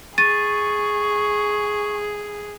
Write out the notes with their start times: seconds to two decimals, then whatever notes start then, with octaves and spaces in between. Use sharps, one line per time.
0.18 G#4 C#6 A6 D#7